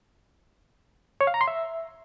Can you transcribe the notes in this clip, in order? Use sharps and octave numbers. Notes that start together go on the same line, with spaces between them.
C#5
F5
A#5
C6
E5